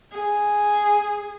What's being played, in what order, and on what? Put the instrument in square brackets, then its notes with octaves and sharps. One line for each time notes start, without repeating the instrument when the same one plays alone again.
[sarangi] G#4